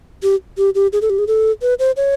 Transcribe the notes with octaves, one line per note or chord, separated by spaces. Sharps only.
G4
G4
G4
G#4
A4
G4
G#4
A4
B4
C5
C#5